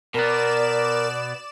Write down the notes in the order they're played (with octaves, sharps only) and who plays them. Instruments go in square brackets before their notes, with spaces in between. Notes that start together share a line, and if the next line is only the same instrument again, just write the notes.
[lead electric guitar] B2 B3 [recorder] A#4 [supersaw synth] D5 E7